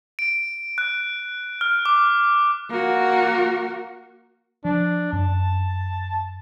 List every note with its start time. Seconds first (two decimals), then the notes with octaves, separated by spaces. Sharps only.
0.19 D7
0.78 F#6
1.61 F6
1.86 D6
2.70 A#3 F#4
4.65 F3 D4
5.13 F#2 A5